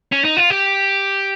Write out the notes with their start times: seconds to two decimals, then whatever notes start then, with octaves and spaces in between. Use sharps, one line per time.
0.12 C#4
0.24 D#4
0.37 F4
0.50 G4